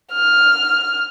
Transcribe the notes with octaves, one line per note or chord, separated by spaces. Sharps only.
F6